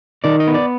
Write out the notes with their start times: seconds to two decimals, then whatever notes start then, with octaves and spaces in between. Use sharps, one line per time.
0.24 D#3 D5
0.40 D#5
0.47 B3
0.54 D5